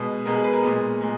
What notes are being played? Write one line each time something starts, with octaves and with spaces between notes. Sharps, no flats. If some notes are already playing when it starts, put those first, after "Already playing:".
Already playing: B2 G#3 B3
B2 G#3 B3 A#4
G#4
B4
A#4
A#2 G#3 B3
A#2 G#3